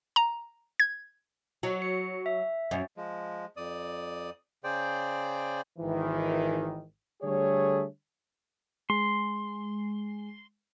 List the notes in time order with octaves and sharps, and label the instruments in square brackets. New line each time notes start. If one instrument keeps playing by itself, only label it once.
[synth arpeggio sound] A#5
G#6
[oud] F#3
[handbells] C#7
E5
[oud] F#2
[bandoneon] F3 G#3
F2 D5 D#6
C#3 G#4 C5 D5 G5
[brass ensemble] G#1 D#3 E3
D3 G3 A3 G#4 C#5
[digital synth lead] G#3 [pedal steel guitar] C6